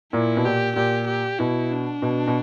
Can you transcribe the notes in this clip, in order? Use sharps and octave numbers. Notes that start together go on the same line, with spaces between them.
A#2 E4
B2
A#2 G4
A#2 G4
G4
B2 E4
D4
B2
B2